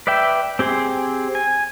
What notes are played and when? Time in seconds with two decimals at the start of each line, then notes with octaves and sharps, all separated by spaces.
0.07 B4 D5 E5 G5
0.59 C4 G4 G#4 C5
1.35 G#5